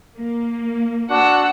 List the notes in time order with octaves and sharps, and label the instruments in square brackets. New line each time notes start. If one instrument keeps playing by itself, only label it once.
[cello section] A#3
[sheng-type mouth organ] D4 F#4 [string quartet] F#5 E6